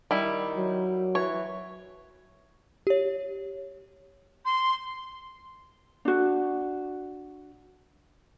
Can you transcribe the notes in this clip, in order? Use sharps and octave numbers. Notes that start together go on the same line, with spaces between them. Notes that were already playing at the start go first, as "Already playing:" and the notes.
D#3 G3 E4
F#3
E3 C#5
G4 C#5
C6
D4 F#4